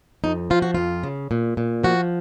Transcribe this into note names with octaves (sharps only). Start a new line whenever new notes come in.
F2 D#4
F3 F4
F#4
F2 F4
C#3
A#2
A#2
F3 F#4